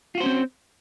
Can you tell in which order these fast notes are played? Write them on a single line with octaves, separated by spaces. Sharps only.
F4 F#4 C5 C#4 C4